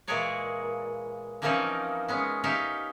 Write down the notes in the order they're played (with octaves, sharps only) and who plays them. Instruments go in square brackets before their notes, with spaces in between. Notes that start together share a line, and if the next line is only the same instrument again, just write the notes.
[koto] A#2 E3 G#3 G#4 C#5 D5
E3 F3 A#3 C4 C#4 D#4
G#3 B3 C#4
C#4 D#4 G4 E5 F5